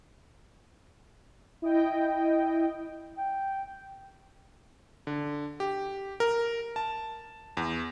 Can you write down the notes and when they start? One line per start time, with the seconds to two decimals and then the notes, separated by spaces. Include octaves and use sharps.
1.62 E4 D#5 G5
3.18 G5
5.07 D3
5.60 G4
6.20 A#4
6.76 A5
7.57 E2